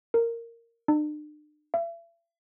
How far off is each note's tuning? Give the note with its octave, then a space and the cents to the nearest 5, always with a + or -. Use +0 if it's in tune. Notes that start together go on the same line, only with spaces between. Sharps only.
A#4 -10
D4 +45
E5 +40